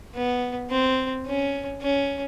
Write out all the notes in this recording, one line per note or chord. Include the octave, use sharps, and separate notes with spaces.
B3
C4
C#4
C#4